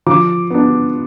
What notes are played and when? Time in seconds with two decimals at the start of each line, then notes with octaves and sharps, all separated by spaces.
0.06 F3 D6
0.50 B3 D4